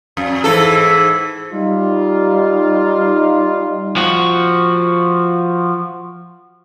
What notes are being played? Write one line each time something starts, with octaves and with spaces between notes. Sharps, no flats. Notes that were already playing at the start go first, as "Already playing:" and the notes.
F2
G#2 E3 A4
G3 D#4 F4
F3 F#4